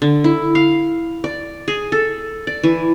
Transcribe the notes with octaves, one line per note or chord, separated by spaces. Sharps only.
D3
E4
F5
D5
G#4
A4
D5
E3